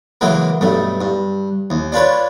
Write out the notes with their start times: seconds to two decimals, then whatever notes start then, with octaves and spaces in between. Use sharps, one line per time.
0.21 C#3 E3 F#3 G#3 A#3
0.61 B1 G2 A3
1.01 G2
1.70 D#2
1.92 D4 F4 B4 C#5